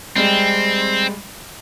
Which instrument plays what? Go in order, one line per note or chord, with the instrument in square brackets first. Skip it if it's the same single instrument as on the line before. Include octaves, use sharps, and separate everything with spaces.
[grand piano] G3 G#3 [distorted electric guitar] C4